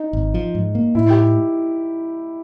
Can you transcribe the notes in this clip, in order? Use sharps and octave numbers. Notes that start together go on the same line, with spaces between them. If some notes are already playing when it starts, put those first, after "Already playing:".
Already playing: D#4
G#1
F3
G#2
A#3
A2 E4
G4